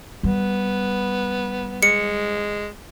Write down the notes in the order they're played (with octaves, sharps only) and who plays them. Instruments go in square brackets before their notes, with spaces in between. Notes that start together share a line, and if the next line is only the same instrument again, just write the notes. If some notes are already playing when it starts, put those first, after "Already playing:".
[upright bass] G3 [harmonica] B3
[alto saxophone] G#3 [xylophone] C#7